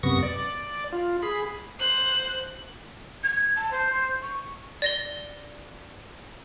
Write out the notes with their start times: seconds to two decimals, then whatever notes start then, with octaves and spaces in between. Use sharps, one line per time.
0.03 F#2 C3 B3 C#6 A#6
0.23 D5
0.93 F4
1.23 G#4 B5
1.80 C5 F#6
3.23 G#6
3.56 A5
3.71 C5
4.22 C#6
4.82 D5 A#6 G7